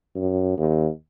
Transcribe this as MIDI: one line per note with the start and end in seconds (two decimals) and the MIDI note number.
0.16 0.57 42
0.58 0.89 39